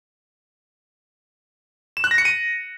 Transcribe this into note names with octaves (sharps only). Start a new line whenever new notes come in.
E7
F#6
A#6
C#7
D#7